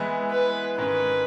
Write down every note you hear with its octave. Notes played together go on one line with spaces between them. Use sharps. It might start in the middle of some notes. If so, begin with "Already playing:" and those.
Already playing: E3 G#3 B3 E4
B4
G#2 D#3 G#3 C#4 B4